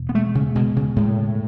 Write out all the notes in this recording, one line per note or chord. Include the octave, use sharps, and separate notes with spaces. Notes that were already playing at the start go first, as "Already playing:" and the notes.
Already playing: E2 B2
B3
G#3 A3
C#3
B2 G#3
C#3
A2 G#3